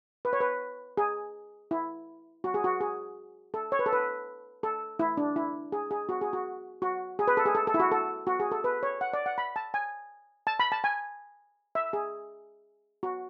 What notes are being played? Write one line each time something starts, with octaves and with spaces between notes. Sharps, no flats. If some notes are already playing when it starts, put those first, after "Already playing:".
B4
C#5
B4
G#4
E4
F#4
G#4
F#4
G#4
A4
C#5
B4
A4
B4
A4
E4
D4
E4
G#4
G#4
F#4
G#4
F#4
F#4
G#4
B4
A4
G#4
A4
A4
E4
F#4
A4
F#4
G#4
A4
B4
C#5
F#5
D5
F#5
B5
A5
G#5
A5
B5
A5
G#5
E5
G#4
F#4